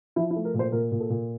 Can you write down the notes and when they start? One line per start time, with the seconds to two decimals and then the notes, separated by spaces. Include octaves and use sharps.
0.16 F3 E4
0.30 E4
0.36 A3
0.45 A#4
0.54 A#2
0.59 C5
0.72 A#2 A#4
0.92 A#2
1.01 A4
1.10 A#2